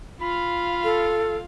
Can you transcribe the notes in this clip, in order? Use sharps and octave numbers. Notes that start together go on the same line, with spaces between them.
F4 F5 B5
A4